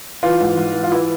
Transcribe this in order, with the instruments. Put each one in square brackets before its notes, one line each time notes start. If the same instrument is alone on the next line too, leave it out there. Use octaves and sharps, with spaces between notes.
[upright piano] E3 F4
G#2
G#2
E3
F4
E3 E4